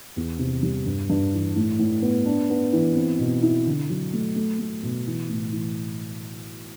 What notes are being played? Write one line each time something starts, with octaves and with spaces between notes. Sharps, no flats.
E2
C3
G3
G2
G2
E3
A2
A2
B3
D4
B3
E3
C4
B2
E4
D3
F#3
A3
A3
A3
B2
E3
A2
E3